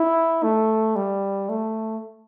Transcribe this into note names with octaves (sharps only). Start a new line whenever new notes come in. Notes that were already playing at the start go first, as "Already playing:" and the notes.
Already playing: E4
A3
G3
A3